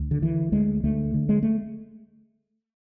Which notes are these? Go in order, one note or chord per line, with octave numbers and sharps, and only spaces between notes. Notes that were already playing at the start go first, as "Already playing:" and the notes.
Already playing: D2
D3
D3 E3
D2 G#3
D2 A3
D3
G#3
A3